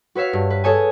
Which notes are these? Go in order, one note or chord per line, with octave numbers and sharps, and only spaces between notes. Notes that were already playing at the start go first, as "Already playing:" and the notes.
F#4 B4 C#5 E5 F5
G2
B4
G#4 A4 C#5 G#5